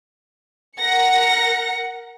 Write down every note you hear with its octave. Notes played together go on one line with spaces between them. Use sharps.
A#4 F#5 A#6 C#7